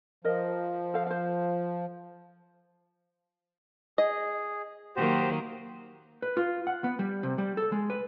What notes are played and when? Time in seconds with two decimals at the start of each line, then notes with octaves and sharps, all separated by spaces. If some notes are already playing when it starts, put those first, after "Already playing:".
0.24 F3 A#4 D#5
0.94 A4 C5 F5
1.07 C5 F5
3.98 G#4 D#5
4.96 D#3 F#3 A#3 F#4 G4 C5
6.22 B4
6.37 F4
6.67 F#5
6.84 B3
6.99 G3
7.23 C3
7.38 G3
7.57 A4
7.72 G#3
7.90 B4